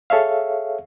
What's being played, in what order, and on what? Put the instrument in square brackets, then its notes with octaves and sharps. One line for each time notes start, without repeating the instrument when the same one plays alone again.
[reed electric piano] G#4 A4 C#5 E5 F5